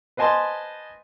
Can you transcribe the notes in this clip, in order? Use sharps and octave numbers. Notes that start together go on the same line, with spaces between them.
B4 C5 D#5 G#5 A5 C6